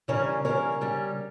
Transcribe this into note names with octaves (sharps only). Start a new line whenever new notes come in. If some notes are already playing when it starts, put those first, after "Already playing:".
C#3 E3 G3 C#4 A#4 C#5
C#3 E3 G3 C#4 A#4 C#5
C#3 G3 C#4